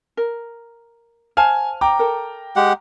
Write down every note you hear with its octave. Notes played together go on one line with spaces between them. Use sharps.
A#4
C5 F5 G#5 A5 F6
G5 A#5 D6
A4 A#4
G#3 G4 F#5